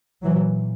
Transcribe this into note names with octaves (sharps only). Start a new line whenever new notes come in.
A#2 E3 F#3